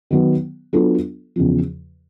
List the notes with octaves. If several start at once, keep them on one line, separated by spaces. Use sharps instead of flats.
D#3 F#3 B3
F#3 B3 D4 F4 A4
E2 C#3 F3